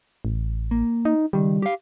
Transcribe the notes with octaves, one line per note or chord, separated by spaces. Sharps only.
A1
A#3
D#4
C#2 D#3 G3
G4 F5